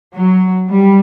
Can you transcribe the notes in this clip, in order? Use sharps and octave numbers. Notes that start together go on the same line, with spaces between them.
F#3
G3